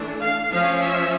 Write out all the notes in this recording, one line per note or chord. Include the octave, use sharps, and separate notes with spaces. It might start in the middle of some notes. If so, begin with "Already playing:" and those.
Already playing: E3 A3 D4
F5
F3 C#4 F5
E5